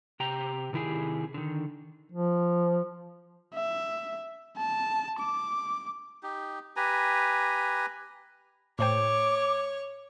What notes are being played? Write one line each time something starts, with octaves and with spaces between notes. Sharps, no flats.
C3 G4 G5 A#5
C3 D#3 E4 G4 G#4
D3 D#3
F3
E5
A5
D6
D#4 G4
G4 B4 G#5 A#5
A2 C5 C#5 G5 D6